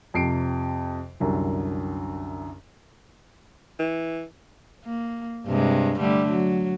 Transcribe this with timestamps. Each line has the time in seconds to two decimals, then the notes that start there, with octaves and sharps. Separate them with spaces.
0.14 F2 C3 C7 D7
1.20 C2 F#2 D3
3.79 E3
4.85 A#3
5.47 G2 C3 G#3
5.99 D3 G3 A3
6.30 F#3